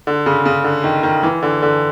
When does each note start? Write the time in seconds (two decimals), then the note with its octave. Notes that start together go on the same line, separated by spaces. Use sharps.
0.07 D3
0.26 C#3
0.45 C#3
0.64 D3
0.84 D#3
1.03 D#3
1.23 E3
1.43 D3
1.62 D3